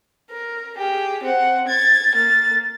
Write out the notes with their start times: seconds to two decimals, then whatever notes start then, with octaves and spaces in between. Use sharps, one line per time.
0.31 A#4
0.77 G4 G#4
1.24 C4 F#5
1.67 G#6 A6
2.16 A#3 A6